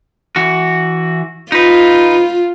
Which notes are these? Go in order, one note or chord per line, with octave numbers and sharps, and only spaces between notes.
E3 F#4
D#4 F4 B4